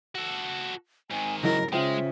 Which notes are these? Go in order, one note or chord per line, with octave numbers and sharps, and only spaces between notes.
F#4 A4
G#2 D#3 G#5
C#3 F#3 E4 A#4 D#5
C#3 G#3 F4 C5 E5 G5